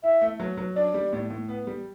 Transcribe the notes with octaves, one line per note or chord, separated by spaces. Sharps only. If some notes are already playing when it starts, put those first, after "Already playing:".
E4 E5
A3
F#3
F#3
D4 D5
G3
A2
A2
B3
G3